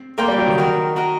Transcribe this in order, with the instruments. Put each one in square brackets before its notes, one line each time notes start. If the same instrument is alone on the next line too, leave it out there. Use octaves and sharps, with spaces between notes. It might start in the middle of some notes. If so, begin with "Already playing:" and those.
Already playing: [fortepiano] C4
[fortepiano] A#3 [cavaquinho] A#4 D5 G5 C6
[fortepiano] G3
F#3
D#3
[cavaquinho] F#4 A#4 D#5
F#4 A#4 D#5